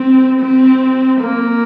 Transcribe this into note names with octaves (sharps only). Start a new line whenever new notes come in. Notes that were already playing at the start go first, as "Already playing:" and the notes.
Already playing: C4
C4
A#3